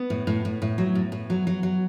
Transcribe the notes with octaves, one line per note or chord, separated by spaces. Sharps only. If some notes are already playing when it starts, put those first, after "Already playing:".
Already playing: B3
A2
A2
A2
A2
F#3
A2
A2
F#3
F#3
F#3